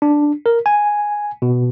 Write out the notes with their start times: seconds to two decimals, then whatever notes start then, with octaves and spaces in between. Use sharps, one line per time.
0.02 D4
0.46 A#4
0.66 G#5
1.42 B2